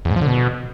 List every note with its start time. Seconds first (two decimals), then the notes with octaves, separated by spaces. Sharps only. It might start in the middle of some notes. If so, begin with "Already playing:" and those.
0.05 E2
0.11 G#2
0.16 F3
0.21 D3
0.27 B2